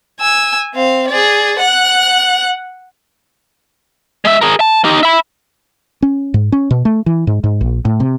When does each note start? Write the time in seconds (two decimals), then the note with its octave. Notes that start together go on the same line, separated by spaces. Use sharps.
0.20 G#5 E6
0.74 C4 F5
1.08 G#4 D5
1.59 F#5 F#6
4.25 G#3 E5
4.42 G#4 A#4
4.60 A5
4.85 D#4 G4
5.03 E5 B5
6.02 C#4
6.34 G#2
6.52 C#4
6.71 B2
6.85 A3
7.06 E3
7.27 G#2
7.44 G#2
7.61 A#1
7.85 A2
8.00 C3